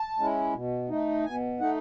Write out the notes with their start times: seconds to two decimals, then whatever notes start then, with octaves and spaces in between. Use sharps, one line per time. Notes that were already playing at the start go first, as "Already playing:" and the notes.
Already playing: A5
0.19 G#3 C#4 E4
0.54 B2
0.89 A3 D#4
1.25 B2 G#5
1.60 A3 D#4 F#5